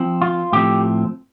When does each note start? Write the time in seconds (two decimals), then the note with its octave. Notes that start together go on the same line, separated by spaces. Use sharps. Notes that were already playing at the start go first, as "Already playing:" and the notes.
Already playing: F3 C4
0.22 F4
0.53 A2 F3 C4 G4